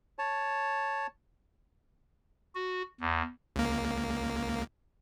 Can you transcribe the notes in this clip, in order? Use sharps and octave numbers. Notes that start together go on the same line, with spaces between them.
C#5 A5
F#4
E2
C#2 A#3